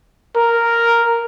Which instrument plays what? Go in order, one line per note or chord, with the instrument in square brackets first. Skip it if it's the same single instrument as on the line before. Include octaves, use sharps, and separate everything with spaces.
[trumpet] A#4